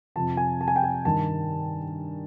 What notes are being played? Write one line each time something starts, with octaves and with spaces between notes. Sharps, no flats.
F2 C3 F3 A5
G#5
A5
G#5
G5
G#5
G2 D#3 G3 A5